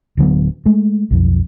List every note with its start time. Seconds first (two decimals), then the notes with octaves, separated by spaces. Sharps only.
0.17 D1 D3 F#3 B3
0.66 G#3 A3
1.11 B1 F2